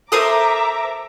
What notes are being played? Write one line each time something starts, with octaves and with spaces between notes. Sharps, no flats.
A4 A#4 C5 E5 A#5 D6 D#6